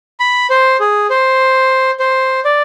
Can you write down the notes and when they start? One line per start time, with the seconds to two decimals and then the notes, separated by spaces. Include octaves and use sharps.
0.20 B5
0.50 C5
0.80 G#4
1.10 C5
2.00 C5
2.45 D5